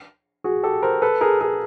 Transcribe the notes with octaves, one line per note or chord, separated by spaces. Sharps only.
F#4 G#4
G4 A4
A#4 C5
A4 B4
G#4 A#4
G#4 A#4